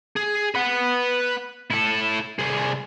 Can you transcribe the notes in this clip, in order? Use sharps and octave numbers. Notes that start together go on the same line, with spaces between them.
G#4
B4 F#5
E4 A4
C2 G#4